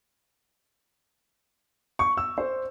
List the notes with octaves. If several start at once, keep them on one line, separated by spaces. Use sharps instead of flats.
C#6
E6
C5